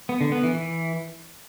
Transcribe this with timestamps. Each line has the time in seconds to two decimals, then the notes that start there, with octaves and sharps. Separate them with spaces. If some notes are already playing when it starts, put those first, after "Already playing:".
0.09 B3
0.21 D3
0.32 B3
0.43 E3
0.55 E3